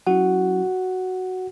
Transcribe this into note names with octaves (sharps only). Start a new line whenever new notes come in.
F#3 C#4 E4 F#4 F#5